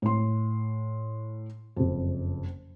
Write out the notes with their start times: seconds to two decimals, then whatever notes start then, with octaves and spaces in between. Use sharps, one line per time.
0.02 A2 C6
1.76 F#1 F2